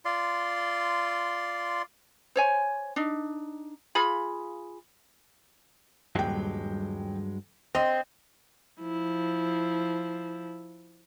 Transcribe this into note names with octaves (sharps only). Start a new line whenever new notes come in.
F4 D5 C6
C5 C#5 G#5
D4 D#4
F4 G#4 B5
D#1 G2 F#3 G#3 G5
C4 D#5
F3 E4